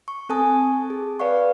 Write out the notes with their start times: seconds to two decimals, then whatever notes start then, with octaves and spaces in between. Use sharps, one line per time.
0.08 C#6
0.29 C4 A4 G#5 A5 D#6
0.90 G#4
1.19 B4 D5 F5 F#5 C#6